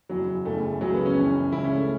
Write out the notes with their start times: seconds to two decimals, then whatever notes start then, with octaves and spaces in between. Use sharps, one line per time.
0.09 F#1 E2 E3 F#3
0.45 F#1 E2 C#3 E3 A3
0.81 C#2 C#3 E3 F#3
0.94 B3
1.06 C#4
1.17 F#1 F#2 E3
1.52 C#2 C#3 E3 E4
1.64 C#4
1.76 A3